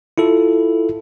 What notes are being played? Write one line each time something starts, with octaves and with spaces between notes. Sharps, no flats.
E4 F4 A4